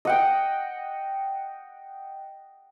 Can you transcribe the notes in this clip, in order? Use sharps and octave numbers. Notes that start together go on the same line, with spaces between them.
D#5 F#5 G5